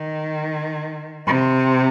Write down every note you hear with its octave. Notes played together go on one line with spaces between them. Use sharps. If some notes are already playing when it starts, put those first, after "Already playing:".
Already playing: D#3
C3